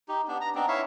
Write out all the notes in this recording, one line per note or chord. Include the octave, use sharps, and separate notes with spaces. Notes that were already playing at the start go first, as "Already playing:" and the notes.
D#4 G4
B3 D4
A#5
B3 C4 D4 D#4
E4 C#5 E5 F5